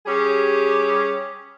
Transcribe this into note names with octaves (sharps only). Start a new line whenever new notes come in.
G3 C#4 G4 G#4